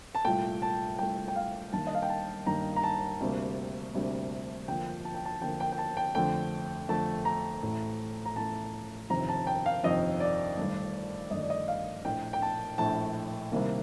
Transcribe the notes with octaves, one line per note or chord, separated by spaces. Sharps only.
A5
C2 A#2 A3 G5
A5
C2 A#2 A3 G5
G5
F5
G1 G2 D#3 G3 A#3 A5
D#5
F5
G5
A5
G1 G2 D#3 G3 A#3 A#5
A#5
A5
D2 C3 G3 A#3
D2 C3 G3 A#3
F2 D3 F3 A#3 G5
A5
G5
A5
F2 D3 F3 A#3 G5
G5
G5
A5
G5
F2 D3 A3 G5
F2 D3 A3 A5
A#5
A1 A2 A3
A#5
A1 A2 A3 A5
G1 F2 C3 D#3 A#5
A5
G5
F5
G1 F2 C3 D#3 D#5
D5
G1 G2 D#3 A3
G1 G2 D#3 A3 D#5
D5
D#5
F5
A#1 A2 A3 G5
G5
A5
A#1 A2 A3 A5
C2 C3 D#3 A#3